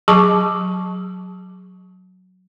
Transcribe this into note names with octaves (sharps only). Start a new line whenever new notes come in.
F#3 G#4 A5 C#6 D6